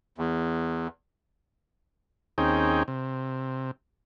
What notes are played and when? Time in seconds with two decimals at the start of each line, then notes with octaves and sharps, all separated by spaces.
0.18 E2
2.38 D#2 C4 C#4 D#4 G#4 G5
2.88 C3